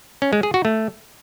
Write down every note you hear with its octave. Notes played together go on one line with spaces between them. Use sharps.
C#4
G#3
G#4
F#4
A3